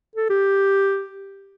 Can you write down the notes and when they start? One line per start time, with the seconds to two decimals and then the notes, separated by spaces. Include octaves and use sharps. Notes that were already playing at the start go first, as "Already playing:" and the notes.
0.16 A4
0.30 G4